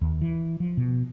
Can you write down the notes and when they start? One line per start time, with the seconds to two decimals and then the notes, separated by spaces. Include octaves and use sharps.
0.01 D#2
0.21 E3
0.60 F3
0.77 B2